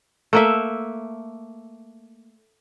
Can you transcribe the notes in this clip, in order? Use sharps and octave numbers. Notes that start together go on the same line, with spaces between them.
A3 A#3 E5